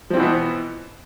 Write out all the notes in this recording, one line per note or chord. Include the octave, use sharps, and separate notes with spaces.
B2 E3 F3 B3 C4